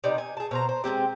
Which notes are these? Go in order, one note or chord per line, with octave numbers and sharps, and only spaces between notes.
C3 B3 D#4 D5
G#5
G#4 A5
B2 C5 A#5
C5
G#3 A#3 C4 G4